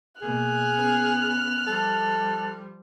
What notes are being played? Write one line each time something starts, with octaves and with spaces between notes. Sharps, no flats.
B2 A#3 G#4 F6 F#6
B3 C#4
F3 G3 A4